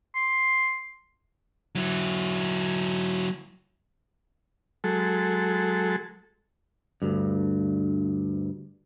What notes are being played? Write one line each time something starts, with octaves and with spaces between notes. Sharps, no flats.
C6
F#3 E4
F#3 G#3 A4
D2 G2